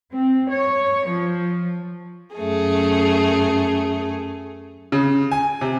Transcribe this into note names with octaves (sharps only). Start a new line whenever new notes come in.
C4
C#5
F3
F#2 A3 G#4
C#3
G#5
C3